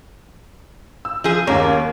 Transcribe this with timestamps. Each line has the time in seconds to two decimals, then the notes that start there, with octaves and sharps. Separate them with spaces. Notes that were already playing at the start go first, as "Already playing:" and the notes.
1.05 E6
1.24 F3 G#4
1.47 D#2 A#3 C#4